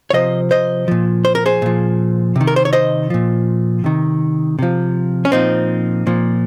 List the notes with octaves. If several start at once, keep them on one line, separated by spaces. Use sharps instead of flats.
C#5
C3 F3 C5 D#5
C5 D#5
A#2 F3
C5
A#4
G#4 C5
A#2 F3
C3
D#3
A#4
C5
C#5
C5 D#5
A#2 F3
C3 D#3
C3 F3
C#4
A#2 F3 C4 D#4
A#2 F3